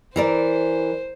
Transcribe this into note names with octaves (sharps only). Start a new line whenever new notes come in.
E3 A#4 C5 D5